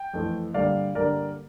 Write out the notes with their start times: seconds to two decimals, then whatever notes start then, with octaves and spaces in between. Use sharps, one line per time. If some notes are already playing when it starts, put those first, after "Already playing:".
Already playing: G5
0.14 F2 E3 A3
0.54 G2 D3 G3 A#3 D5 F5
0.95 G2 D3 G3 A#3 A#4 D5